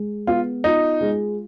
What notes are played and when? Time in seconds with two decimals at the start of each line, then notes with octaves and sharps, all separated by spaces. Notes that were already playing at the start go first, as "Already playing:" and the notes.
Already playing: G#3
0.27 B3 F4
0.64 D#4 F4
1.01 G#3